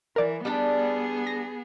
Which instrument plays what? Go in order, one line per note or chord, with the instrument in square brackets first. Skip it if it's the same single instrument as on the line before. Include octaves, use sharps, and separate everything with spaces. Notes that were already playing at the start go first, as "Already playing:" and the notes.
[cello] E3 [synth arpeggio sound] A#4 D5
[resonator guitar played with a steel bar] G3 D4 [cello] B3 G#4
[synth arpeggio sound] A#6